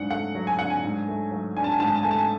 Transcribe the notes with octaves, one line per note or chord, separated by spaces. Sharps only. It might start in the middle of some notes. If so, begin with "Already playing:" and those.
Already playing: G#2 F#3 D4 F#5
A3 F#5
F#3
G#5
D4 F#5
G#5
G#2
A3
F#3
D4 G#5
A5
G#5
G#2 A5
G#5
A5
A3 G#5
A5
G#5